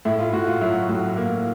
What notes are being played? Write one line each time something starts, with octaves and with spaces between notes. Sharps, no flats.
A2 E4
F4
A2 F#4
F4
F#3 E4
A2
A#3